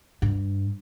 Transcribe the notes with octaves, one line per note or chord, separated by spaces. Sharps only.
G2